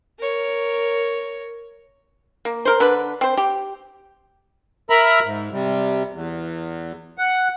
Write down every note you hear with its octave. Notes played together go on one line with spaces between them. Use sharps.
A#4 C#5
A#3
A#4 C5
D3 B4
C4 C5
G4
A#4 E5 A#5 B5
G#2
C3 G3
E2
F#5